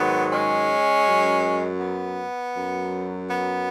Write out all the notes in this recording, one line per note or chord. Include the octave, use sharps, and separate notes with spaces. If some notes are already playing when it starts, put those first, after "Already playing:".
Already playing: G#2 D#3 F#3 B3
G#3 C#4
F#2 F#3
B3
F#2 F#3
B3